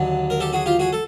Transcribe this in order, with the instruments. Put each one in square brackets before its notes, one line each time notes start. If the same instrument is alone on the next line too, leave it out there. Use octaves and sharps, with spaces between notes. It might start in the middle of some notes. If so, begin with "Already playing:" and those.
Already playing: [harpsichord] D#2 D3 F#3
A#4
G4 A4
F#4 G#4
F4 G4
F#4 G#4
A4